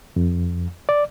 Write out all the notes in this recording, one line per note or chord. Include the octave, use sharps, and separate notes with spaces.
F2
D5